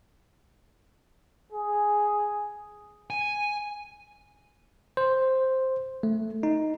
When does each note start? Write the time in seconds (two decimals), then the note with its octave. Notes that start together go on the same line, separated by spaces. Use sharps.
1.52 G#4
3.10 G#5
4.97 C5
6.03 A3
6.43 D#4